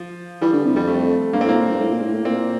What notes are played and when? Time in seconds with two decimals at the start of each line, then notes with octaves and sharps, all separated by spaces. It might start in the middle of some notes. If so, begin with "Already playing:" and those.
Already playing: F3
0.41 E3 G3
0.53 D3
0.65 C3
0.76 F2 G3
0.88 A3
1.33 G2 A#3
1.41 C4
1.45 A2
1.49 A#3
1.56 A#2
1.68 G2
1.79 A2
1.91 A#2
2.02 A2
2.13 A2
2.25 A#2 C4